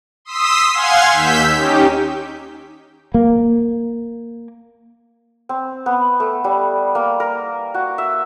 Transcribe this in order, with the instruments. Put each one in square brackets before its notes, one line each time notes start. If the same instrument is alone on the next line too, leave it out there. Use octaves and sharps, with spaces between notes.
[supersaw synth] C6 D#6 E6 B6
F5 F#5 G#5 C6 F6 G#6
D#2 E6 G6 B6
C#4 D#4 G4
[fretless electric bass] A#3
[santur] C4
B3
A3
G3
A#3
A#4
F#4
E5